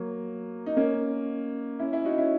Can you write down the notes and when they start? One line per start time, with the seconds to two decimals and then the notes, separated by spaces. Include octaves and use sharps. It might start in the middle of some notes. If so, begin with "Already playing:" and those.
Already playing: F#3 A#3
0.66 D#4
0.77 A#3 C#4
1.80 C#4 E4
1.93 C#4 E4
2.05 D#4 F#4
2.18 C#4 E4